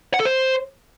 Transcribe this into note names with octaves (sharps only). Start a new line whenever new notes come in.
F#5
A4
C5